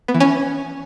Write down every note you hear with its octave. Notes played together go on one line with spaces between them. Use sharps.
B3
E3
C#4